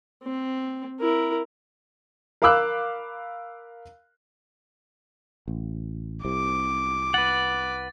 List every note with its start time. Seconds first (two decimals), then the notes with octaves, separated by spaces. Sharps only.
0.24 C4
1.00 E4 A#4
2.42 A#4 F5 B5 D6 E6 F#6
5.48 A1
6.25 C2 C3 D6
7.14 B4 F#5 A6